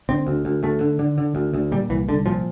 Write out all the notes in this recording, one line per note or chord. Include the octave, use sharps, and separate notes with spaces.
D3 C4
D2
D2
D2 A3
D3
D3
D3
D2
D2
A#2 G3
C2 E3
C2 D3
A#2 F3